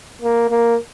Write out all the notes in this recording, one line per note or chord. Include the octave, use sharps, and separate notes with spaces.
A#3
A#3